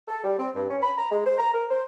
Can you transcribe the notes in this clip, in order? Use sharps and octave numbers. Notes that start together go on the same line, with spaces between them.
A4
G3
C4
G2
C#4
B5
A#5
G#3
C5
A#5
A#4
C5